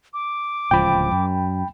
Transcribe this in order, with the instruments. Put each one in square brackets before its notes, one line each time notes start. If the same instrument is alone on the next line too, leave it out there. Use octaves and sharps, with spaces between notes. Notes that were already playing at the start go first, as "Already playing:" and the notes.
[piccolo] D6
[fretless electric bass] D1 C#2 F3 [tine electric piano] G5 B5
[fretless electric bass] F#2